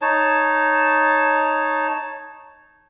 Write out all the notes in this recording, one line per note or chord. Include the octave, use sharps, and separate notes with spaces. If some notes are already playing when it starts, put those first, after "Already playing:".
D#4 C#5 A5